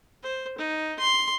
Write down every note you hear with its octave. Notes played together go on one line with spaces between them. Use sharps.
C5
D#4
C6